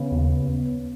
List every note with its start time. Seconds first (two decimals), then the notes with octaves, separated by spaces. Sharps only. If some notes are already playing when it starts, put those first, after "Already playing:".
Already playing: C#3 B3
0.12 D#2